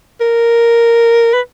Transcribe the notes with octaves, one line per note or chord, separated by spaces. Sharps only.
A#4
B4